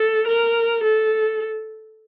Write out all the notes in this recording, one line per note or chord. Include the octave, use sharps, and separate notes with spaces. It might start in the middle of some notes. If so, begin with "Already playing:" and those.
Already playing: A4
A#4
A4